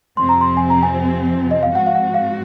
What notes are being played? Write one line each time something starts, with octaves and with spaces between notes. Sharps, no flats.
F2 C3 F3 C4 C6
A#5
C6
G#5
A#5
G#5
D#5
F5
G#2 F3 C4 F#4 F#5
F5
F#5
F5